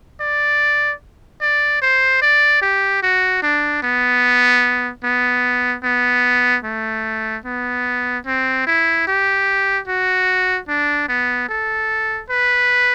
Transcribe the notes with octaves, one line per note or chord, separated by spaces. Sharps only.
D5
D5
C5
D5
G4
F#4
D4
B3
B3
B3
A3
B3
C4
E4
G4
F#4
D4
B3
A4
B4